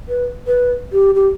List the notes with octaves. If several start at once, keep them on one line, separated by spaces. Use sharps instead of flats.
B4
B4
G4
G4